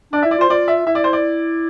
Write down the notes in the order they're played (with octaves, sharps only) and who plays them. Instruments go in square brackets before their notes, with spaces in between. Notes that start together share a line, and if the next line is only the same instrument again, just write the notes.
[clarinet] D4 [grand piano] D5
[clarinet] E4 [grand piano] E5
[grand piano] D5
[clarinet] F4
[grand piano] C5
[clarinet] F4 [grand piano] D5
[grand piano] E5
[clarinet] E4 [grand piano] E5
[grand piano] D5
C5
D5